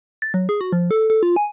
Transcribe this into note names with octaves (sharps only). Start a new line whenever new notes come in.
A6
F#3
G#4
F#4
F3
A4
A4
F4
G#5